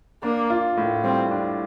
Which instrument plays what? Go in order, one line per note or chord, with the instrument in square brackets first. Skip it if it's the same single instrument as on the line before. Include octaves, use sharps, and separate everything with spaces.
[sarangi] A#3 [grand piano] D4
[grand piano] F4
A2
[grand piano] G3 [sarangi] C4
[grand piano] D4